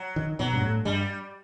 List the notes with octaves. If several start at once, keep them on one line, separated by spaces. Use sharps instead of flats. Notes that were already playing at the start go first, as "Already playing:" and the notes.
Already playing: F#3
D#3
B2 F#3
G2
A2
G2 G3